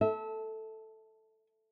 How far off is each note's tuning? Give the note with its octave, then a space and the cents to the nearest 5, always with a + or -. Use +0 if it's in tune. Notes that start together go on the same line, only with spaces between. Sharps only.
A4 +0 E5 -25